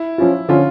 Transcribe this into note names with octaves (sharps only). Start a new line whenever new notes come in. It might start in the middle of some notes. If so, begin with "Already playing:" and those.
Already playing: E4
F3 C#4 F4
D3 F3 C#4 F4